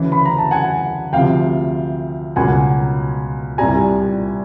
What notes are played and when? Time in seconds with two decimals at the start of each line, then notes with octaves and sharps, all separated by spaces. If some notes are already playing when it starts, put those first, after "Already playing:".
Already playing: D2 C#3 E3
0.12 B5
0.26 A#5
0.38 A5
0.51 F#5 G#5
1.13 D2 C3 F3 F5 G5
2.36 C#2 B2 F#3 A#3 F#5 G#5
3.58 C2 A#2 G3 G#5 A#5